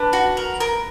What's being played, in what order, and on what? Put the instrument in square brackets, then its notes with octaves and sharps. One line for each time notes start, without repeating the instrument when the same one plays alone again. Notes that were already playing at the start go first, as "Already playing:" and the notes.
Already playing: [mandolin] D4 [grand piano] B4
[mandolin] F#4
A#4
A#4